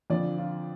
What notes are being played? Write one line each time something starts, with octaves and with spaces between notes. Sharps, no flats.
F2 D3 F3 D5
F4